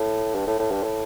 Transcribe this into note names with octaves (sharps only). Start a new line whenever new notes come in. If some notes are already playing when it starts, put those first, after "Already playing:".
Already playing: A2
G2
A2
A2
G2
A2